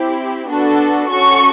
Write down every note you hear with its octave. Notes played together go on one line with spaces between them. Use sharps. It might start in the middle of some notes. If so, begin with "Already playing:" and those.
Already playing: C4 E4 G4
B3 D4 F#4 A4
C#4 F#4 A4 C#6